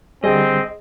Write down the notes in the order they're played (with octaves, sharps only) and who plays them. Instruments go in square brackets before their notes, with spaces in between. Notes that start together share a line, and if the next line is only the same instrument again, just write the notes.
[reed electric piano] D3 G3 [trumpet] C4 [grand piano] G#4 [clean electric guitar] D#5